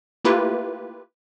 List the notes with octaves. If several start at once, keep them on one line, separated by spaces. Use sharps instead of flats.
A3 A#3 E4 F4 G4 B4